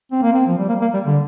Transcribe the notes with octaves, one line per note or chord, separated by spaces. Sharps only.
C4
A#3
C4
F3
G3
A#3
A#3
G3
D3